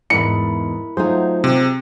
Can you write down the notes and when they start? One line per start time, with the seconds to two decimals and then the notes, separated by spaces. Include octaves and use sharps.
0.10 E2 G#2 G#3 E4 A#4 B5 C#7
0.97 F#3 A3 D#4 F4 G#4 C5
1.44 C3